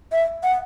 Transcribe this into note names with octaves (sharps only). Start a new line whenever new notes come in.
E5
F#5